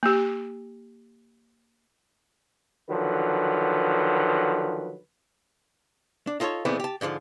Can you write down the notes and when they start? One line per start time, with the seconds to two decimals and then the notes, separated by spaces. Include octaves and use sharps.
0.03 A#3 G4
2.90 D3 D#3 F3 F#3 B4
6.27 D4
6.40 D#4 F4 A4 C5 C#5
6.65 A#2 E3 G#3 A3 B3 C4
6.80 G4 A5
7.01 G#2 D3 E3 F3